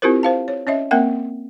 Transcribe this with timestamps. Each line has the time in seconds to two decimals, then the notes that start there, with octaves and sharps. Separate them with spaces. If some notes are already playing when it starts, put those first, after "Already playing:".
0.02 C4 E4 F4 G4 A#4 C5
0.23 C5 F5 A5
0.48 C#5
0.67 C#4 C#5 D#5 E5
0.91 A#3 C4 A#4 E5 F#5 G5